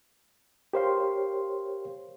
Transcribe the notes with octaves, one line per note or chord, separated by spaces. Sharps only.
G4 A#4 C5 C#5 F5 C6